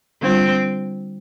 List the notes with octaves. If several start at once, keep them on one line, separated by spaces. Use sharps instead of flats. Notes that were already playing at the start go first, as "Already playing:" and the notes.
D3 G3 C4 D4 F4